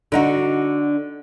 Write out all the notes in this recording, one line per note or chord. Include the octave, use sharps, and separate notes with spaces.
D3 D#4 F#4